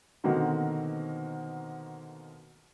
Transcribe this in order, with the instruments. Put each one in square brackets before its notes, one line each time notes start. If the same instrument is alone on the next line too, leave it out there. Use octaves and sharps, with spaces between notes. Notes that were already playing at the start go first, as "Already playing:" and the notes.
[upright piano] B2 D3 D#3 A#3 C4 F#4